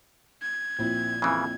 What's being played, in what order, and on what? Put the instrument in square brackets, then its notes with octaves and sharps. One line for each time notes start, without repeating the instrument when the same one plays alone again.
[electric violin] G#6
[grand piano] A#1 [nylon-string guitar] C4 E4
[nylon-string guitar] F2 E4 [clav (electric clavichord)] C#3 E3